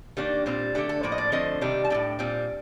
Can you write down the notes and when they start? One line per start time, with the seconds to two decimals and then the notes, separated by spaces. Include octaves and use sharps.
0.17 D#3 A#3 D4 G4
0.46 A#2 G3 C4
0.75 D3 A3 D4 G4
0.89 A4
1.03 A2 F3 A#3 D5
1.12 D#5
1.18 D5
1.32 D3 F3 A3 C4 D#5
1.61 C3 D#3 G3 D4
1.85 A5
1.90 A2 A3 D4 G5
2.19 A#2 G3 C4